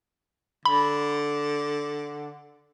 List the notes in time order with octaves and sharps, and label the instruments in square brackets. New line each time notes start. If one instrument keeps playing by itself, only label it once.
[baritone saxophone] D3 [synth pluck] B5